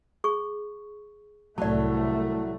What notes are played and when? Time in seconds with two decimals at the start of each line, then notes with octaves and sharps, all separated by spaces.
0.24 G#4 C#6
1.58 C2 A2 F#3 A3 D5 A5